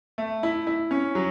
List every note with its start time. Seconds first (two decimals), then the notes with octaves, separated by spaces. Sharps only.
0.18 A3
0.43 E4
0.67 E4
0.91 C#4
1.15 F#3